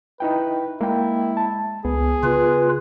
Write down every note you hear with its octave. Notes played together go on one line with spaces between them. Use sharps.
D#4 E4 B4 G5
G#3 A#3 E4 G5
A5
C#2 B3 G#4
C#3 F4 B4